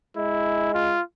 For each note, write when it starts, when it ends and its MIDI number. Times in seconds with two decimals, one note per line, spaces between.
0.17 0.96 56
0.17 0.73 64
0.74 1.01 65